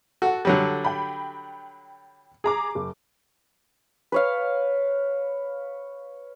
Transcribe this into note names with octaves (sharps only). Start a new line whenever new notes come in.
F#4 A4 F#5
D3 F#3 G3
G5 B5
G#4 A#5 D6
F#1
B4 C#5 F5